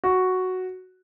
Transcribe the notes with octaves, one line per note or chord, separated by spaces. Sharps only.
F#4